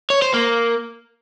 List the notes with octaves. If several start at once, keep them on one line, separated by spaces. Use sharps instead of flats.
C#5
C5
A#3